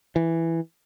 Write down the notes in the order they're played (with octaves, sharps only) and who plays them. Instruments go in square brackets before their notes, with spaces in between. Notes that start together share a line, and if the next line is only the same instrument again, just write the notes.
[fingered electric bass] E3